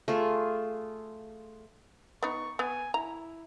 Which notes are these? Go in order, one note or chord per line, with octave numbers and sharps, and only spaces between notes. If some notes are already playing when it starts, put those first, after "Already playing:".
A3 F4 G#4
B3 D#4 C#6
B3 G#5
E4 A#5